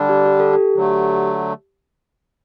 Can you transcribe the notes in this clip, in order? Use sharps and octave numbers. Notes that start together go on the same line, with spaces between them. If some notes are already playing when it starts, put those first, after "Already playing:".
Already playing: D3 G3 D4
G4
G4
A4
G4
D3 F#3 A3